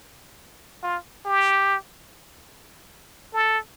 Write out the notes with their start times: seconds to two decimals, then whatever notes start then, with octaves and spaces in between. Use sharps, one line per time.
0.83 F4
1.25 G4
3.33 A4